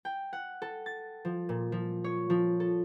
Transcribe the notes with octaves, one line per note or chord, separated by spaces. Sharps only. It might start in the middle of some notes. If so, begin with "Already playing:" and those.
G5
F#5
A4
A6
F3
A#2
F3
C#5
F3
A4